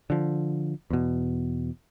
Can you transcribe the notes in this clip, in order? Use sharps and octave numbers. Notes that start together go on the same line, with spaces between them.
D3 F3
E2 B2